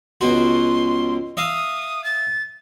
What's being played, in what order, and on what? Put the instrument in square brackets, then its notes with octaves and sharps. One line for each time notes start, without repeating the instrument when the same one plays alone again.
[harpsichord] C#2 B2 F#4 [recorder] C6
[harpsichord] E5 F5 [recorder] D#6
[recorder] A6